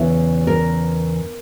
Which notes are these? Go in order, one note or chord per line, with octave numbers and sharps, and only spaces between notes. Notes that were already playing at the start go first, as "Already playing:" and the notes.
Already playing: E2 C#3 E3 E4
A#4